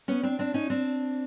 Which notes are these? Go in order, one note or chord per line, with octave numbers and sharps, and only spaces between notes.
B3 C#4
C4 D4
C4 D4
C#4 D#4
C4 D4